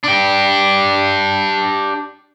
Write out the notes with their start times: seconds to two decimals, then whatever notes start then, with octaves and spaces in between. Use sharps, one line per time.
0.04 D4 G4